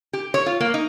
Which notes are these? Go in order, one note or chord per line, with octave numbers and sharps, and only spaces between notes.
G4
C#5
F4
A#3
D#4